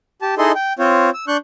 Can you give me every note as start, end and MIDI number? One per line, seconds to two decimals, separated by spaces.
0.22 0.35 67
0.22 0.35 81
0.38 0.52 63
0.38 0.52 64
0.38 0.52 68
0.38 0.52 69
0.38 0.52 75
0.38 0.52 84
0.55 0.73 79
0.79 1.10 60
0.79 1.10 65
0.79 1.10 72
0.79 1.10 73
1.14 1.25 88
1.28 1.37 62
1.28 1.37 85
1.28 1.37 90
1.28 1.37 91